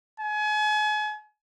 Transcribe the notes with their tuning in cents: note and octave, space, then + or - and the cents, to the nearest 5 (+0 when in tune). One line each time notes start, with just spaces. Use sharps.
G#5 +35